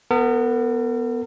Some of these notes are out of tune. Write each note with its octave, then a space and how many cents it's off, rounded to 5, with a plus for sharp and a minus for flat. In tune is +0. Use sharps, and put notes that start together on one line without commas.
B3 +0 A#4 -45